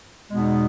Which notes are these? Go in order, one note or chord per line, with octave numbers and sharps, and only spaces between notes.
E2 B2 G#3 B3 D#4